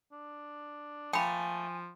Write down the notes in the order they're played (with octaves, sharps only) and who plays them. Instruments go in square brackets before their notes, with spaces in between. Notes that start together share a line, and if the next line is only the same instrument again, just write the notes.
[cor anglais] D4
[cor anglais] F3 [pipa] A3 A#3 [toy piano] G5 B5 [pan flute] G#5